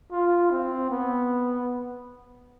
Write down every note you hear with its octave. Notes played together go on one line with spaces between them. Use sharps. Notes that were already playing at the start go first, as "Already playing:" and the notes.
F4
C4
B3